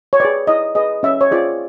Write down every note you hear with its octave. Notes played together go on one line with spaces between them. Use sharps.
C#5
G#4 B4 D5
E4 D#5
G#4 B4 D#5
C#4 E5
C#5
F4 G#4 C5 D5